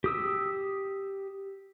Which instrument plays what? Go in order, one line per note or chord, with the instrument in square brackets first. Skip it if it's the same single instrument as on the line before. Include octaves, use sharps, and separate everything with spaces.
[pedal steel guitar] G4 D#6 E6